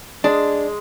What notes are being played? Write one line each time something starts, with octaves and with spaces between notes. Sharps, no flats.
G#3 D4